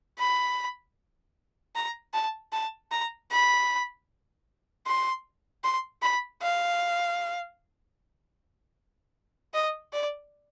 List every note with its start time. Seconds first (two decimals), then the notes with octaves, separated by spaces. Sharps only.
0.19 B5
1.75 A#5
2.14 A5
2.53 A5
2.91 A#5
3.31 B5
4.87 C6
5.64 C6
6.03 B5
6.42 F5
9.54 D#5
9.93 D5